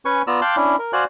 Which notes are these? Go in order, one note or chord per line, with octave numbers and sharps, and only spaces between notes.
C#4 B4 G#5 C#6
B3 F4 D5 A#5 E6
F5 G5 A5 C6 D6 F#6
C#4 D4 E4
A#4
F#4 C5 D5 F5 G#5 F#6